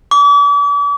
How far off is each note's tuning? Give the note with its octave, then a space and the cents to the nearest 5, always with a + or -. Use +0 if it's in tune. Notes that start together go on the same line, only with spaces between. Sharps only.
D6 -40